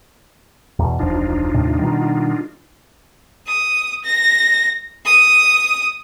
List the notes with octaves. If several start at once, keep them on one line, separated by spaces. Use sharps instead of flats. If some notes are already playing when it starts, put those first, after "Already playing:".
E2 B2
E1 C#2 F3 D4 D#4 F4
D#2 A2 C3
B2 D#3 G3
D#6
A#6
D#6